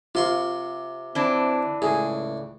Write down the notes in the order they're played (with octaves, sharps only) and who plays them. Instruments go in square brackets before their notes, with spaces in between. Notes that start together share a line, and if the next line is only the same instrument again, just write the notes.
[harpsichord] C3 C6 C#6 [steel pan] F4
[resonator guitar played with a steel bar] E3 D4 [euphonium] C4
[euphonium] C#2 [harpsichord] A2 [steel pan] G#4